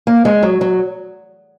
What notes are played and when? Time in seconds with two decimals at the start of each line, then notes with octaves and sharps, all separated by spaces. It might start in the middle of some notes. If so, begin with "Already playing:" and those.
0.07 A#3
0.25 G#3
0.43 F#3
0.61 F#3